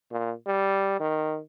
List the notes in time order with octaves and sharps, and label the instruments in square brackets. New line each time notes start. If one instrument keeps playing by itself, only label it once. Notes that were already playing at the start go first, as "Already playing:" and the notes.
[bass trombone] A#2
G3
D#3